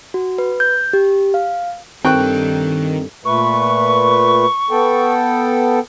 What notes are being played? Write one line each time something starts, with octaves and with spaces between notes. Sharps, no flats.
F#4
B4
G6
G4
F5
G2 D#3 C4 A4 G5 C#6 F#6
A#2 A3 B4 C#6
B3 A4 G5